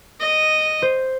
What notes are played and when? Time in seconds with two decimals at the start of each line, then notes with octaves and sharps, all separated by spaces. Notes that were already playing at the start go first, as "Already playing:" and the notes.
0.20 D#5
0.82 C5